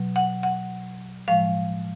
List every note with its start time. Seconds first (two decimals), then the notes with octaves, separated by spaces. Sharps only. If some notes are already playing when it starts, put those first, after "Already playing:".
Already playing: B2 F#3
0.16 F#5
0.43 F#5
1.28 A2 F3 G#3 F5